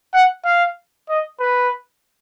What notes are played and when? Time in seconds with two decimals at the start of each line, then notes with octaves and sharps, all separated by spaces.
0.14 F#5
0.45 F5
1.09 D#5
1.40 B4